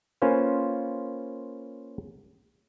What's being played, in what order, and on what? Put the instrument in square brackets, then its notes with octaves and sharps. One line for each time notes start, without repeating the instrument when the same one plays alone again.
[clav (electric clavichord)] A#3 C#4 F4 B4 C5 F5